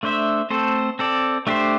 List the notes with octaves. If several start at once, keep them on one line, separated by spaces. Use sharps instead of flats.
A3 D4 C5 E5
A3 C4 A4 C5
C4 A4 D5
A3 D4 G4 C5